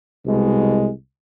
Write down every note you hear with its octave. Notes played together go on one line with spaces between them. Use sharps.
C2 B2 G#3